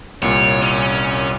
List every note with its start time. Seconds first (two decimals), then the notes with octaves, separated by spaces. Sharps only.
0.22 C2 A#2 C#5
0.62 C#4